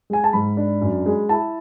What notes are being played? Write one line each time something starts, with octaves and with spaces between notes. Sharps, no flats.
G#3 G#5
A5
G#2 B5
D4
F#2
G#3
E4 A5